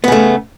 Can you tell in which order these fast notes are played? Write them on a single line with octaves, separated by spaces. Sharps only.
B3 C#3 A3